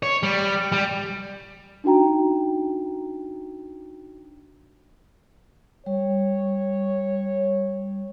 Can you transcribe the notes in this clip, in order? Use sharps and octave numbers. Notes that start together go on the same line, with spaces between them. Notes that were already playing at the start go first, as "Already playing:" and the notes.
C#5
G3
G3
D4 D#4 F#4 G5 A#5
G3 C#5